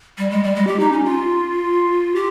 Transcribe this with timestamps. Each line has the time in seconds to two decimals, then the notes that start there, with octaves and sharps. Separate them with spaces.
0.18 G3
0.30 G#3
0.43 G3
0.55 G#3
0.67 G4
0.80 D#4
0.92 C#4
1.05 F4
2.15 G4